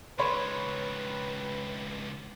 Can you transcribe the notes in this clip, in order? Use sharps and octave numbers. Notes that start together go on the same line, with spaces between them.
C#2 D#3 B4 C#5 B5 C6